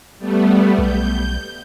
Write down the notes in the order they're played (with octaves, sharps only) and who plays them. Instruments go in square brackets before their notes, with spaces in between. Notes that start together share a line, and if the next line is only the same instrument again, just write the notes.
[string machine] G3 A3 B3
[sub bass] B1 [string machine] G6